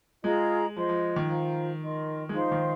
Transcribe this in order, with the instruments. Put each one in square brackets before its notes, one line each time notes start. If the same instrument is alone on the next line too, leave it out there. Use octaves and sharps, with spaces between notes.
[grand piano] G#3 [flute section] F4 G#4 D#5 A#5
[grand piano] F3 [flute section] C5 D#5 C6
[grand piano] F3
D#3
[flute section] F4 C5 F5 A#5
D#4 A#4 D#5 C6
[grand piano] G#3
[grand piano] F3 [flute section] D#4 C5 F5 C6
[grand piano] D#3